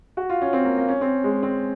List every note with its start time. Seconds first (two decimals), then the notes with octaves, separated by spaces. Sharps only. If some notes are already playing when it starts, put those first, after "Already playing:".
0.17 F#4
0.29 F4
0.41 C#4
0.53 C4
0.65 A#3
0.77 A#3
0.89 C#4
1.01 C4
1.24 G#3
1.43 C4